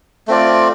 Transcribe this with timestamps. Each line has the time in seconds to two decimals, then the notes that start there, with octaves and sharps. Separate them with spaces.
0.27 A3 C4 F4 D5